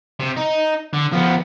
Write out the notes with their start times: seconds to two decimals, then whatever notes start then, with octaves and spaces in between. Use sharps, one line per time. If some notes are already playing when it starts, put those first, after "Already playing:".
0.20 C3
0.37 D#4
0.93 D3
1.13 F3 B3